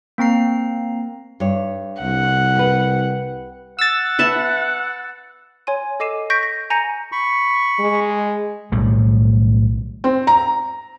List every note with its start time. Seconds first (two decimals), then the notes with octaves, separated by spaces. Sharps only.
0.18 A#3 C4 A#5 C7
1.40 G2 C#5
2.02 C2 F#5
2.56 G4 B4
3.79 F#5 E6 A6
4.19 B4 E5 A5
5.67 C#5 G#5 C6 D#7
6.00 A4 D#5 D6 C7 D#7 E7
6.30 C#6 G6 A#6 B6 D7
6.43 A#6
6.70 G#5 A#5 G6 A#6 C#7 D#7
7.12 B5 C#6
7.80 G#3
8.72 B1 A2 D#3 G3
10.04 C4
10.27 A#5